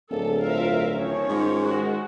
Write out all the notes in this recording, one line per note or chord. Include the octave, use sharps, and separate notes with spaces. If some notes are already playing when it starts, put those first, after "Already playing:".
D1 A#3 G#4 A4
G2 F4 A#4 C5 E5 F5
D#3 F3 C#4 C#5
G#2
D#3 G#3 F#4